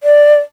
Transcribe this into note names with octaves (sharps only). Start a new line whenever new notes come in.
D5